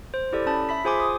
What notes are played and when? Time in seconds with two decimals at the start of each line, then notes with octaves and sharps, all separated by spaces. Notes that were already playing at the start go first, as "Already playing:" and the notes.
0.14 C5
0.33 E4 G4 A4 D5
0.46 C#4 A5 B5
0.69 E5 B5 B6
0.84 F4 G#4 C5 G#5 C6 D6
1.00 D#6